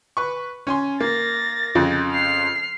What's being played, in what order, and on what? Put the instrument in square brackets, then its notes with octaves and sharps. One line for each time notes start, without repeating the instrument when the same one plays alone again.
[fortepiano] B4 C#6
C#4 G#5 C6
[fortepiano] A#3 [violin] A6 A#6
[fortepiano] F2 C#3 F3
[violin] F6 C7